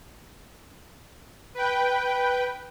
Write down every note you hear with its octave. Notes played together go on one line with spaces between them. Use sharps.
B4 G5